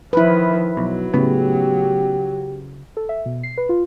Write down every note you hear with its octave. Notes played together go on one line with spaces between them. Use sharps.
D#3 F3 E4 B4
B1 F#3
A2 C#3 B3 G4
A4
E5
B2
C7
B4
F4